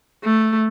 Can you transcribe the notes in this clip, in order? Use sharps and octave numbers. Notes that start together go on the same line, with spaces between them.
A3